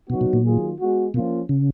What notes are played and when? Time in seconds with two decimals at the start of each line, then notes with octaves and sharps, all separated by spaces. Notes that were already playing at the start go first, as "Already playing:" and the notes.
0.10 B2 F#3 B3 D#4 F#4
0.21 B2
0.33 A#2
0.45 D#3 F#3 A#3 F4 G#4
0.79 G#3 B3 F#4
1.14 B2 F3 A#3 C#4 F4
1.49 C#3